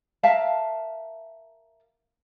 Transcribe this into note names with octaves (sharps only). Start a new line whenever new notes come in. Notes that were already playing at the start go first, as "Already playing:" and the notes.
A#4 E5 F5 A5